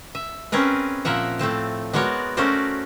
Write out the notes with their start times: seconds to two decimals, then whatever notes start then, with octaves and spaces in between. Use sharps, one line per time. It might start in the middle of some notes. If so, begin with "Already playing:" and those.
0.15 E5
0.52 C4 C#4 G#4 A#4 B4
1.05 A#2 F3 A#4 E5 F#5
1.39 A2 A3 C4 A5
1.93 G#3 B3 F#4 A#4 C#5 D5
2.37 A3 C#4 F#4 A#4 C5 D5